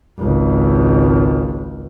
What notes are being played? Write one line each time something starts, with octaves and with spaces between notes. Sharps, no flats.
G#1 C#2